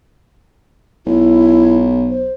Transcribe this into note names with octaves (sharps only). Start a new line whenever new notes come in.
B1 E4
C5